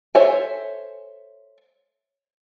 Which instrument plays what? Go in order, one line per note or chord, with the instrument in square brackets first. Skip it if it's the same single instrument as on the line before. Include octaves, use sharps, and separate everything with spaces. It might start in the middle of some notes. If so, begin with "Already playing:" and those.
[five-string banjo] A4 C5 C#5 E5 G#5